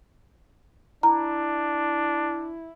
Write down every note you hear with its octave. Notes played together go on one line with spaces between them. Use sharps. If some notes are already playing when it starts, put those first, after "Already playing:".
D4 E4 A#5